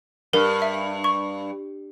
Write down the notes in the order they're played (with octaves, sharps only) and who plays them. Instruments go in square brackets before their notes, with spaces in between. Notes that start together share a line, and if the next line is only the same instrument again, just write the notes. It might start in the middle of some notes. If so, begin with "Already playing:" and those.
[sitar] G2 [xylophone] A#4
[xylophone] E5
C#6